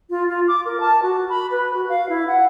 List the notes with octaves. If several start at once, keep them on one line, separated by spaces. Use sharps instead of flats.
F4
F4
D6
A#4
A5
F#4
B5
B4
F#4
F5
E4
F#5